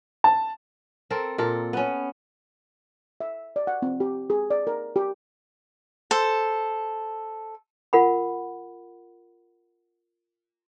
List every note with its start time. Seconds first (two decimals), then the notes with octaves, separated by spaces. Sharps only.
0.24 A5
1.10 C4 A4 A#4
1.38 A#2 A4 A#4
1.73 B3 C#4
3.20 E5
3.56 D5
3.67 F#5
3.82 C4
4.00 G4
4.30 G#4
4.50 D5
4.67 A#4
4.96 G4
6.11 A4 C5
7.93 F4 A#4 F#5 B5